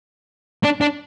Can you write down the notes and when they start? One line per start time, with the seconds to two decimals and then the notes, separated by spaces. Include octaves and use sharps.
0.64 D4
0.81 D4